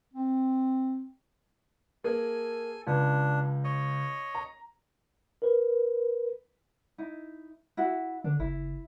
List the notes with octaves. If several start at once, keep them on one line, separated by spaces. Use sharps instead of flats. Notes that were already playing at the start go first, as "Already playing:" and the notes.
C4
A#3 G#4 A4 G#5
C#2 D4
C#5 D#5
A#5
A#4 B4
D#4 E4
E4 F#4 E5
D3 D4
F#1 E4